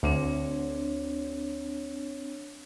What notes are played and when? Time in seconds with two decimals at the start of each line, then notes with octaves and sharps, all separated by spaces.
0.03 D2 C4 D4 C#5